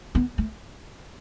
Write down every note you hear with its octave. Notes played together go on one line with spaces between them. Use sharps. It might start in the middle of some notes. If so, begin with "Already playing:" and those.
B3
A3